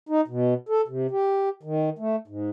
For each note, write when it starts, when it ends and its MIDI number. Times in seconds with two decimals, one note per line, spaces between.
0.09 0.21 63
0.28 0.54 47
0.69 0.82 69
0.88 1.07 48
1.11 1.49 67
1.63 1.90 51
1.99 2.16 57
2.28 2.50 44